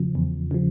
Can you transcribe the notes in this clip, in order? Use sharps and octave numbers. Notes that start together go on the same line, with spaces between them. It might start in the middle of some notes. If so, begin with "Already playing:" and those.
Already playing: E2 C#3 F3
E2
C#3 F3